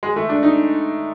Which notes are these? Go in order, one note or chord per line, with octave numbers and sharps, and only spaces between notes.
G#3
A3
D4
D#4